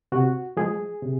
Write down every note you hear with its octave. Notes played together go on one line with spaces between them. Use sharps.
C3 F#4
F3 G#3 G#4
C3